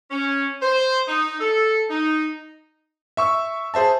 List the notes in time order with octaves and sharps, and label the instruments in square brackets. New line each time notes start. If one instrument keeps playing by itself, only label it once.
[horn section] C#4
C5
D#4
A4
D#4
[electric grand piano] E5 C#6 E6
G#4 C5 E5 A5